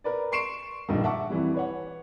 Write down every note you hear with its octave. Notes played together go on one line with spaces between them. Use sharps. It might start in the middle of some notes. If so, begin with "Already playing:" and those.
A#4 B4 D5
C6 C#6 C7 D7 E7
A#1 G2 D#3
E5 F#5 A5 C#6 D6
F2 E3 G3
B4 C#5 F#5